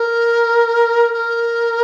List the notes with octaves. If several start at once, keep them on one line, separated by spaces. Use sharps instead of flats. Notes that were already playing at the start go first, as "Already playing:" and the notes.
Already playing: A#4
A#4